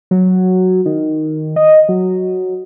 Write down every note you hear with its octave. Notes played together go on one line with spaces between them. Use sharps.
F#3
D#3
D#5
F#3